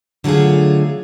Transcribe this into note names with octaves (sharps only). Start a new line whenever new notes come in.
D3 F#3 A3 F4 G#4